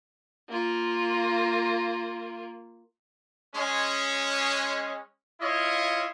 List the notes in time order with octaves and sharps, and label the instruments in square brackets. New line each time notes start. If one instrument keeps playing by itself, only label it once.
[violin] A#3 F4
[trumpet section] G#3 C#4
E4 F4 C#5 D#5 F5